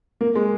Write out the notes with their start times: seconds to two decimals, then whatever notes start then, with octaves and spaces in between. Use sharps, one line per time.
0.21 A#3
0.35 G#3